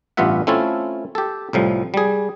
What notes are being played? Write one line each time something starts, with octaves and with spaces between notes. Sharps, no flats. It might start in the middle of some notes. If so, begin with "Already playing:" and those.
A1 G2 B3 F4 E5 F#5
A3 C4 C#4 E4 F4 A4
G4 A4
C2 A2 F3 G3
G3 G#4